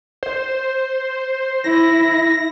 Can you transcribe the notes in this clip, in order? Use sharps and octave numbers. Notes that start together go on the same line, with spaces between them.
C5
E4 A#6